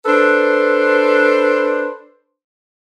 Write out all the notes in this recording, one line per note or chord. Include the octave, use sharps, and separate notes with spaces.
D4 A4 B4 C5